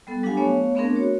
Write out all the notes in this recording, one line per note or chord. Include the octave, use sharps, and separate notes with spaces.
G3 B3 A4
F#3 D4 G4 A4 F5 G#5
A3 B3 C#5 F5
A3 B3 C4 D4 G#4 A#4
F#4 C#5